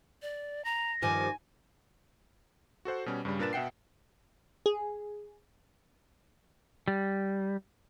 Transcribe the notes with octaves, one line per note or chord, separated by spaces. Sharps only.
D5
A#5 A#6
G2 D#3 F3 G#5 D6
F#4 A4 C5 F#5
B2 G3 C#4
G2 C#3 G3
A#2 D4 A#4 B4 A6 E7
B2 E5 F#5 G5 C7
G#4
G3